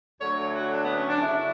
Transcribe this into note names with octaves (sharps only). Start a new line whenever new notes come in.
D2 D3 F#3 A3 C#5
F#4
D4
B3
C#4
D4
F#2 C#3 F#3 E4